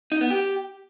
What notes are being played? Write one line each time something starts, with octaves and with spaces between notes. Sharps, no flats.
D#4
B3
G4